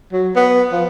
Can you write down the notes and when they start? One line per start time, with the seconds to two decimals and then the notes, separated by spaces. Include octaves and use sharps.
0.13 F#3
0.36 B3
0.72 F3